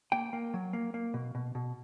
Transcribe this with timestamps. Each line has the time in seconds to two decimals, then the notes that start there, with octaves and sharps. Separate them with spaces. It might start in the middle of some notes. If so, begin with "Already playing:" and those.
0.12 A#3 G5
0.33 A#3
0.54 F#3
0.73 A#3
0.94 A#3
1.14 B2
1.35 B2
1.55 B2